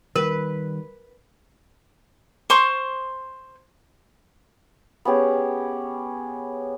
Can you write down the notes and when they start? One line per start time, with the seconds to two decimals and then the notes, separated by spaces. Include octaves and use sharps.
0.16 D#3 G3 A#4 B4
2.50 C5 C6 C#6
5.05 B3 C#4 G4 G#4